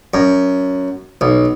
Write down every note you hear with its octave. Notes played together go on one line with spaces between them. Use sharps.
F#2
B1